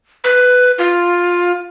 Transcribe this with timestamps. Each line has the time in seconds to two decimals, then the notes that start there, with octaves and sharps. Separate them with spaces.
0.24 B4
0.78 F4